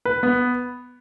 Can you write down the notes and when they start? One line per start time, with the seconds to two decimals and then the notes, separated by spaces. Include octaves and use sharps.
0.05 B4
0.23 B3